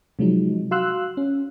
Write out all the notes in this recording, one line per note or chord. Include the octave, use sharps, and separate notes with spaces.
C3 F3 F#3 G#3 D#4
F#4 F5 C6 E6 F#6
C#4